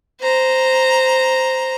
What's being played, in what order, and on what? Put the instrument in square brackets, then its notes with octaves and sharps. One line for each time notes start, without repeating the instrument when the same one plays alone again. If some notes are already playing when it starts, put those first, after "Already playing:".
[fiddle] C5 A#5